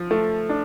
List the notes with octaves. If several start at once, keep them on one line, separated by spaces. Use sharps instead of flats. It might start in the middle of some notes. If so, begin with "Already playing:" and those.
Already playing: F3
A3
D4